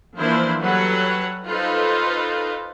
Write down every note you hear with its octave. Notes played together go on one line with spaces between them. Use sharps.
E3 F3 A#3 D4 E4 C5
F#3 G3 A4 B4 C#5 F#5
D#4 F4 A4 B4 C5